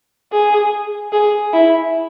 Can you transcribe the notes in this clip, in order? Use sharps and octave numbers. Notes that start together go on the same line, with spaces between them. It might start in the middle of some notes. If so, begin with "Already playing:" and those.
G#4
G#4
E4